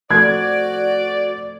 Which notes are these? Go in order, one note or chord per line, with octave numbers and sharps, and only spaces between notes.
F3 A3 F#4 D5 G#6